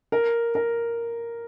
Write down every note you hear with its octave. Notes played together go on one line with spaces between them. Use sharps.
A#4
A#4